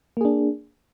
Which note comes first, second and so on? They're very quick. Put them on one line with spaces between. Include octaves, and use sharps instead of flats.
A#3 G#4 D4